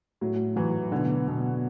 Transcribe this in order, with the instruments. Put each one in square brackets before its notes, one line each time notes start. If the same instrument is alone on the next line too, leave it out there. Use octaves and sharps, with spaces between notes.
[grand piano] A2 [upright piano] F#3
[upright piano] E3 [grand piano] F#3
[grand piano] B2 [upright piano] D3
[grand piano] B2